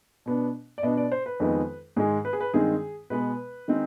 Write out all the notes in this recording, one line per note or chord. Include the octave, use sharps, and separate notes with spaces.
B2 B3 D4
D5
B2 B3 D4 D#5
D5
C5
B4
F2 D#3 G#3 B3 D#4
G#2 D#3 G#3 G#4
B4
G#4
B4
G2 D#3 G#3 C4 D#4 G#4
B2 G#3 B3 B4
D#3 G#3 C4 D#4